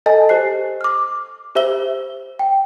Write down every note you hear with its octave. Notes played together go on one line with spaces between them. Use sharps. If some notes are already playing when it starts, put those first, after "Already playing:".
A4 D#5 G#5 A5
G4 C5 F#6 C7
D6 F6
G4 C5 E5 E6 G7
G5